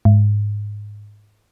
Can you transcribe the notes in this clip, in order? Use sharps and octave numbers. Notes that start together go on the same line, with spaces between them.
G#2